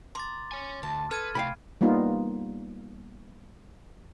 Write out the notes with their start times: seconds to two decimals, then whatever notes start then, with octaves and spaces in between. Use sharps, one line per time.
0.15 A#5 C6 D6 A6
0.52 C#5 G#5
0.83 D2 A5
1.11 A4 B4 F6 G#6 D#7
1.35 C3 A3 F5 G5 B5
1.81 G3 A#3 B3 D#4 F4